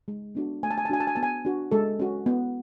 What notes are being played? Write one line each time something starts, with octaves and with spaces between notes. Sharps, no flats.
G#3
B3 D4 F#4
A3 G#5
A5
G#5
A5
D4 F#4 G#5
A5
G#5
B3 A5
G#5
D4 F#4
G#3 A4
C#4 F#4
B3